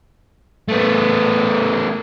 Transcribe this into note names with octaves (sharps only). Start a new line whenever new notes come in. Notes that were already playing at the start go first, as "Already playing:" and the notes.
A3 B3